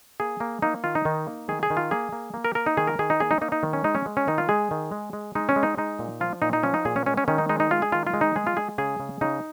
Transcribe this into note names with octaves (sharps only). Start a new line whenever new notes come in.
A#3 G#4
A#3
A#3 D#4
D#3 F4
D#4
D#3
A#3
D#3 G#4
G#4
D#3
F4
A#3 G#4
A#3
A#3
A#4
A#3 A#4
D#4
D#3 G#4
A#4
D#3 G#4
D#4
A#3 G#4
D#4
A#3 D#4
D#4
D#3
C#4
G#3 D#4
C#4
G#3
C#4
D#3 D#4
F4
G#3 G#4
D#3
G#3
G#3
G#3 D#4
C#4
G#3
D#4
G#3 D#4
A#2
F3 F4
A#2 D#4
D#4
F3 C#4
D#4
A#2 G#4
C#4
G#3 C#4
C#4
D#3 C#4
D#4
G#3 D#4
D#4
G#3 F4
G#4
D#3 F4
F4
G#3
D#4
G#3 G#4
F4
G#3 G#4
C#3 G#4
C#3
C#3 D#4